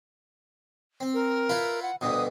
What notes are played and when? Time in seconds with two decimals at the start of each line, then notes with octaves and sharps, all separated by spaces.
1.00 C4
1.14 A#4
1.49 E4 F4 B4
1.82 F#5
2.01 D2 G2 B2 D#6